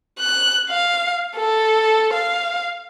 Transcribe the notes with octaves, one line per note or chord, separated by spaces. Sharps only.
F#6
F5
A4
F5